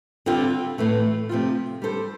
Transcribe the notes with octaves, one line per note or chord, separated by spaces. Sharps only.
D3 G3 C4 F4
A2 E3 A3
C3 F3 A3 C4 F4
G3 D4 A4 C5